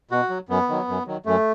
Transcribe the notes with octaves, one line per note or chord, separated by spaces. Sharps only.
B2 F#4
F#3
F#2 B3
D#3 F#3
F#2
D#3 F#3
F#2 A3